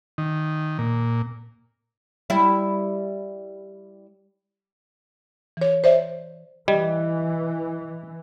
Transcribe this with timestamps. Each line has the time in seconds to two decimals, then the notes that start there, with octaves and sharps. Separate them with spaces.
0.18 D#3
0.79 A#2
2.30 G3 E4
5.57 E3 C#5
5.84 C5 D5 E5
6.68 E3 G3 D#5